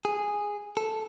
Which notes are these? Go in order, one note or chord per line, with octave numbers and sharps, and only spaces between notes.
G#4
A4